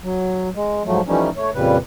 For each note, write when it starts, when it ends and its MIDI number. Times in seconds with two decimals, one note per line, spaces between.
0.03 0.49 54
0.55 0.83 56
0.85 1.01 44
0.85 1.01 53
0.85 1.01 54
0.85 1.01 57
1.07 1.29 52
1.07 1.29 53
1.07 1.29 55
1.07 1.29 57
1.07 1.29 61
1.07 1.29 63
1.37 1.50 57
1.37 1.50 73
1.54 1.77 41
1.54 1.77 46
1.54 1.77 49
1.54 1.77 55
1.54 1.77 71